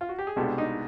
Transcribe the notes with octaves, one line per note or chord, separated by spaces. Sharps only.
F4
F#4
G4
G#4
C2 B2 G#3 B3 D4 G4 A4
D#4